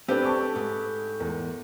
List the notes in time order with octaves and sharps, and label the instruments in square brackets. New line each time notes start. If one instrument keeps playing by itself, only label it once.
[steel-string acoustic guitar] A3 [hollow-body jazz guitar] C4 D4 [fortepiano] G4 B4
[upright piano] A5 C#6 D6
[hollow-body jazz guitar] G#2
[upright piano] E2 A#4